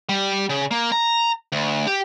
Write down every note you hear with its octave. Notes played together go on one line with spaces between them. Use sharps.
G3
C#3
A#3
A#5
D2
G4